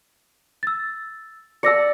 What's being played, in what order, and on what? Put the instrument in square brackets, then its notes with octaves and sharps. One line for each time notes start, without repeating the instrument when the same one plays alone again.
[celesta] E6 A6
[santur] D5 A5 [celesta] E6 A#6 C#7